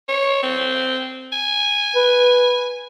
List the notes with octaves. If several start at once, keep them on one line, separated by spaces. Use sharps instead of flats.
C#5
C4
G#5
B4